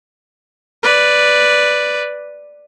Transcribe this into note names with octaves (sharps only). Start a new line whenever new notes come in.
B4 D5